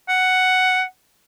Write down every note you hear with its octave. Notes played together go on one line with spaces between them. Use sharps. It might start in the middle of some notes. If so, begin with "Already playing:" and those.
F#5